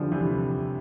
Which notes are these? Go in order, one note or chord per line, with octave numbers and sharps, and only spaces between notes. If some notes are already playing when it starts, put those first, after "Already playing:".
Already playing: D3 E3 F3 G3
C3 E3